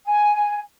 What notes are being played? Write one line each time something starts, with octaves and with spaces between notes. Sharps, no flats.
G#5